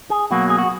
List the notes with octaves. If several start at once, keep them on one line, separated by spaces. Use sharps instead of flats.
G#4
B1 B2 F#3 A#3 F#4
G#4
F#4